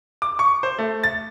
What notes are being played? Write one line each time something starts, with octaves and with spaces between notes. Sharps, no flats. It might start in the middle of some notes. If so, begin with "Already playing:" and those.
D6
C#6
C5
A3
A6